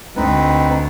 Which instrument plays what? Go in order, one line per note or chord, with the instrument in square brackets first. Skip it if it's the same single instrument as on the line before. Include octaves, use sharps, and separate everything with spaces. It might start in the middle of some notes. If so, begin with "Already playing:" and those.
[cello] D2 [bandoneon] C4 D#4 B4